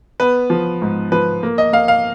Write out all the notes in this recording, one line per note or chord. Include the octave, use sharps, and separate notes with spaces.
B3 B4
F3
G#2
F3 B4
A#3
D#5
A#3 F5
F5